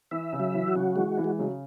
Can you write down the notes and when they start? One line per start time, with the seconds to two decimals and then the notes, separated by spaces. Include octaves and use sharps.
0.11 E3 E5
0.33 C#3
0.40 F#3
0.54 E3
0.68 F#4
0.75 C#3
0.96 E3 G#3
1.17 E3
1.24 G#3
1.39 C#3 F#3